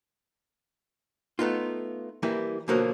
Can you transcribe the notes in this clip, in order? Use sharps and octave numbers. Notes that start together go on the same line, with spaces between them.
A3 B3 D#4 F4
E3 G3 A#3 E4
B2 D3 F3 F#3 A#3